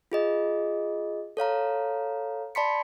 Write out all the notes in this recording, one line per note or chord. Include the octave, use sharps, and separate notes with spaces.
F4 G#4 D#5
A4 C#5 F5 A#5
D5 A5 B5 C6 B6 C#7